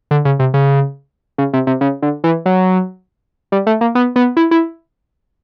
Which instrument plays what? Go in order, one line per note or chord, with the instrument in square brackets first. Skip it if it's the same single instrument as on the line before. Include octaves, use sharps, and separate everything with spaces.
[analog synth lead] D3
C#3
C3
C#3
C#3
C3
C3
C#3
D3
E3
F#3
G3
A3
A#3
B3
B3
E4
E4